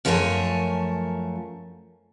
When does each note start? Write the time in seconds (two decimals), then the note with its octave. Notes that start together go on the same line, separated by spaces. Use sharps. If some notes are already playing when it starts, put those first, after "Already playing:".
0.05 F#2 F3 A3 A#4 C#5 G#5